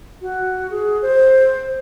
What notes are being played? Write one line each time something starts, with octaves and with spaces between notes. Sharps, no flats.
F#4
G#4
C5